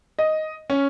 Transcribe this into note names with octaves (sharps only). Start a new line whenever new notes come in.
D#5
C#4